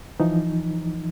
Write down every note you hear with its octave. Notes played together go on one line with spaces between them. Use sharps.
E3 F3 D#4